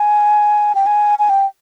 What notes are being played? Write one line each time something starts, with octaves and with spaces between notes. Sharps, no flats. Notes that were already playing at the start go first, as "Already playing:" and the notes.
Already playing: G#5
G5
G#5
G#5
G5